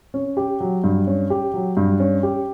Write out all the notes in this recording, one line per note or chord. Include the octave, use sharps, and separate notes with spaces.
C#4
G4
F#3
G2
C#4
G4
F#3
G2
C#4
G4